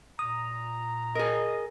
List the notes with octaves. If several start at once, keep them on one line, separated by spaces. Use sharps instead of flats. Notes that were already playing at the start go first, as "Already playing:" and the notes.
A#2 A#5 D#6
G#4 A#4 D#5